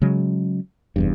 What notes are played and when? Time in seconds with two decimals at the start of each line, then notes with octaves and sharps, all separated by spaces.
0.02 C#3 F#3 G#3
0.96 F1 E2 G2